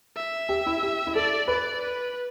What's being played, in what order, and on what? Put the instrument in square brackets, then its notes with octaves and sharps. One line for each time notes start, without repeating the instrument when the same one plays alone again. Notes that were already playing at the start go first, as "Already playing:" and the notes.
[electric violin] E5
[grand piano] G4
E4
G4
E4
[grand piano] A4 [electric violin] D5
[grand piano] B4 [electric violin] D5
[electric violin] B4